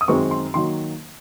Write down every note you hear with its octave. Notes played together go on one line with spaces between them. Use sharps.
D#6
F#2 D#3 G#3 C4 C#6
C6
D#3 F#3 A#3 C6